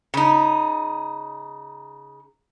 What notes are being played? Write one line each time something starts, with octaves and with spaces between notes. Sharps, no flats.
C#3 D#4